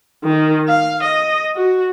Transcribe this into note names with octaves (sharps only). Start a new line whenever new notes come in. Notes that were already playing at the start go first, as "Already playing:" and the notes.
D#3
F5
D#5
F#4